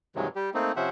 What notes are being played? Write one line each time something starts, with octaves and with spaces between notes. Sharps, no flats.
G2 C3 D#3 E3 F#3 G#3
G3 G4
A3 A#3 C4 D#4
C3 F3 C#4 C5 E5 F#5